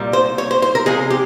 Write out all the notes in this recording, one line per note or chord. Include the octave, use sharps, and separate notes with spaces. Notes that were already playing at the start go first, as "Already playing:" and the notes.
Already playing: C2 A#2 G3
C5
C#5
C5
C5
A#4
C#2 C3 F3 G#3 G#4
G4